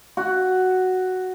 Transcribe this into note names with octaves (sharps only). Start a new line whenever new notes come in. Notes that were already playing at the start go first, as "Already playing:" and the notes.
F#4